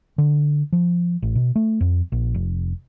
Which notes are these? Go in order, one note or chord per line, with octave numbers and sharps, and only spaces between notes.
D3
F3
A1
B2
A3
F2
A#1
F1